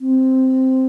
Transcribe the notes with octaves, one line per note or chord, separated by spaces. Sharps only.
C4